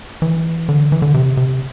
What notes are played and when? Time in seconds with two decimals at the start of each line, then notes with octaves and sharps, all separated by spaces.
0.22 E3
0.69 D3
0.92 E3
1.02 D3
1.14 C3
1.37 C3